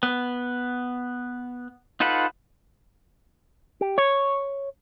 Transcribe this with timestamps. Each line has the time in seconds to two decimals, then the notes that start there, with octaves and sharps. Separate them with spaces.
0.03 B3
2.00 D#4 F4 A4 B4 F#5
3.81 G4
3.98 C#5